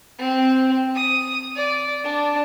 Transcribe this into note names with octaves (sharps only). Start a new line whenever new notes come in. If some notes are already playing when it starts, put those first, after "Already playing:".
C4
D#6
D5
D4